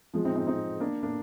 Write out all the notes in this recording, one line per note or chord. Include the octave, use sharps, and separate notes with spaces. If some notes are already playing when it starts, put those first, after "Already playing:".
F3 G#3
C4 D#4
C4 D#4
C4 D#4
A#3 D4
A#3 D4